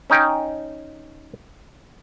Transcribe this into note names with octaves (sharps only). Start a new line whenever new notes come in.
C#4 D#4 G5